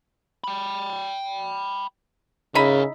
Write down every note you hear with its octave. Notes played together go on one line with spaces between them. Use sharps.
G5 B5
C#3 D#4 E4 A#4 G#5 B5